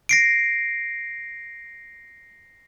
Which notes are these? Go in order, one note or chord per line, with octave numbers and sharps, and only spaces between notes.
A#6 C7 D7